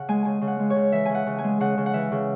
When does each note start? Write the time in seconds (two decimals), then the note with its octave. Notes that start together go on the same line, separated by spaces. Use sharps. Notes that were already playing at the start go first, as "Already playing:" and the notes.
Already playing: C#3 F#5
0.09 G#3 G#5
0.25 C#3 G#5
0.41 C#3
0.48 F#5
0.59 G#3
0.70 C#5
0.76 C#3
0.92 E3 E5
1.05 C#3 G#5
1.15 F#5
1.26 C#3
1.38 G#5
1.44 G#3
1.60 C#3 F#5
1.77 C#3
1.86 F#5
1.94 E3 E5
2.12 C#3